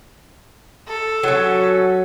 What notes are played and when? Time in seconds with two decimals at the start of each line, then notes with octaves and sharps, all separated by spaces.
0.88 A4
1.23 F#3 C#4